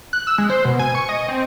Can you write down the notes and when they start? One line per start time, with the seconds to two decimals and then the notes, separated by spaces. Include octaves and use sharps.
0.13 F#6
0.27 E6
0.38 G#3
0.50 C5
0.65 B2
0.79 G#5
0.95 C#6
1.09 D#5
1.28 C4